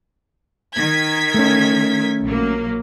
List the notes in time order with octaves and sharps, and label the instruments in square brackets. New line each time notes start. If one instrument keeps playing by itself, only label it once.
[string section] D#3 G#6 B6
[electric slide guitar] A3 C#4
[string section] A#1 F#3 A#3